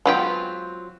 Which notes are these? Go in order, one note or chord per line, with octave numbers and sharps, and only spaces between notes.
F#3 G#3 B3 C4 F4 G4